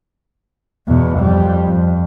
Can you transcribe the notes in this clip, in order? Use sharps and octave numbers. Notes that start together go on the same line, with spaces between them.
E2 B2
F2 G3
F2